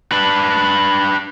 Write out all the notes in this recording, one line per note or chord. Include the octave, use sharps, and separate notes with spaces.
D4 B4